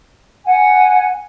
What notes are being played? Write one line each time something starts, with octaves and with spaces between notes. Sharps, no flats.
F#5 G#5